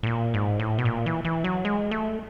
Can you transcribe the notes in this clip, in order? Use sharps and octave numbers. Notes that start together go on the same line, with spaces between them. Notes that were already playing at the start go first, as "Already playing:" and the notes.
A2
A#2
G#2
A2
B2
A#2
E3
E3
F#3
G#3
A3